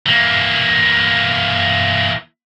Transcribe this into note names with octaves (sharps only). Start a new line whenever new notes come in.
E3 A#3